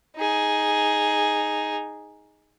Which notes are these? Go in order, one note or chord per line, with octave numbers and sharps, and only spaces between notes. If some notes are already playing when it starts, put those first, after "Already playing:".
D#4 G#4